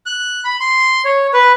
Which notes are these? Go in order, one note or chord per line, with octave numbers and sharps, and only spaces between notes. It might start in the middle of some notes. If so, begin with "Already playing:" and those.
F#6
B5
C6
C#5
B4